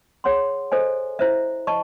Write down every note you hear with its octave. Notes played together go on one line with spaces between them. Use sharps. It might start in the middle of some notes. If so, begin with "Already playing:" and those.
G#4 C#5 F#5 C6
A4 C5 D#5 G#5
E4 C5 E5
D#5 A5 C#6